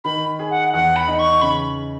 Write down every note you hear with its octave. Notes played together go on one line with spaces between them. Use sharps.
D#3 B5
G#4
F#5
E2 F#5
B5
D#4
C#6
C#3 B5